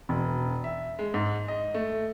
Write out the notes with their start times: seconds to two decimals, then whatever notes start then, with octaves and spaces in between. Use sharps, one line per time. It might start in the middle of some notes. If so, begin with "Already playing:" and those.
0.09 E1
0.64 E5
0.99 G#3
1.14 G#2
1.48 D#5
1.74 A3